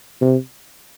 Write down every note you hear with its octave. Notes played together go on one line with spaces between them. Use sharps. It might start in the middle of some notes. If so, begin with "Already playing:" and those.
C3